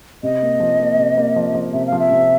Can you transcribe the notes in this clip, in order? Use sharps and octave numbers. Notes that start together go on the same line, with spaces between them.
C3 D#5
A#3
F3
A#3
C3
A#3
F3
F3
C3 E5
F5
F3
E5
C3